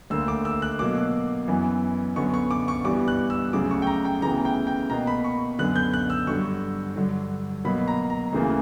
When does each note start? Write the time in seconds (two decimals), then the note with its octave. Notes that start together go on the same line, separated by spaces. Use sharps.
0.10 D2 D3 A#3 E6
0.28 D6
0.45 E6
0.62 F#6
0.79 B2 F#3 A#3 D6
1.48 F#2 E3 B3
2.16 F#2 D3 F#3 B3 C#6
2.34 C#6
2.51 D6
2.68 C#6
2.84 G2 E3 G3 B3 D6
3.08 F#6
3.30 E6
3.53 D2 C#3 F#3 D6
3.71 C#6
3.82 G5
3.87 A#5
4.05 G5
4.22 D2 C#3 E3 B3 A#5
4.45 G5
4.67 G5
4.90 B2 A#3 A#5
5.07 B5
5.24 C#6
5.59 F#2 D3 F#3 B3 F#6
5.76 G6
5.93 F#6
6.10 E6
6.27 G2 D3 F#3 C#6
6.96 G2 D3 F#3
7.65 B2 F#3 A#3 B5
7.88 A#5
8.10 A#5
8.33 D2 C#3 E3 A#3